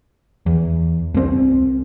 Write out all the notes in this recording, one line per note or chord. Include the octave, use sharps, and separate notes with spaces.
E2
C2 C4